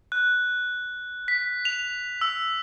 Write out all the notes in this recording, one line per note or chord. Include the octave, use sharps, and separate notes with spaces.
F#6
B6
F7
E6